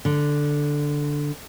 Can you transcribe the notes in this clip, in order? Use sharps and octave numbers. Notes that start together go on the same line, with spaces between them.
D3